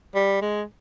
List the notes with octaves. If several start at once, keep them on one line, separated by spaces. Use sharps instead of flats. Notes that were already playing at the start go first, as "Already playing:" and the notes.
G3
G#3